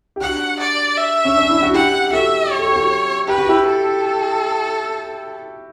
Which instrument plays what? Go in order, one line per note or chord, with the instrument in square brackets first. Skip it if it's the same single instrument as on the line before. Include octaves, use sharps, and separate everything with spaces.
[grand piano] G4
[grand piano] D4 F#4 [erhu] F#5
[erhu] D5
E5
[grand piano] C#4
D4
E4
F#4
[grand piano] E4 G4 [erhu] F#5
[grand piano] G4
[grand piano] F#4 A4 [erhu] E5
[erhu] C#5
[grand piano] A4
G4
F#4 A4
[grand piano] G4 [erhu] B4
[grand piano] F#4
E4 G4
[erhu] A4